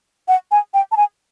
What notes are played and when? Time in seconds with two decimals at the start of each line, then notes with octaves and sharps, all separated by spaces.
0.28 F#5
0.51 G#5
0.74 G5
0.92 A5
0.97 G#5